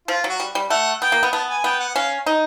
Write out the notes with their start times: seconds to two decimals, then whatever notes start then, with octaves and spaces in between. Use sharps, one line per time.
0.08 F3 F4
0.24 F#3
0.29 F#4
0.40 G3
0.55 G3
0.70 A3 F#5
1.02 B3 G5
1.12 A#3
1.23 B3
1.33 B3 A5
1.49 G#5
1.64 B3 G5
1.80 F#5
1.95 C#4 F5
2.26 D#4